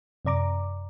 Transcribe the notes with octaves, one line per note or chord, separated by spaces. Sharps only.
F#2 C3 D5 A#5 D6